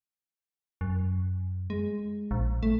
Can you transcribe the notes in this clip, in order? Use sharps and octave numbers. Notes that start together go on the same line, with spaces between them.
F#2
G#3
A#1
A3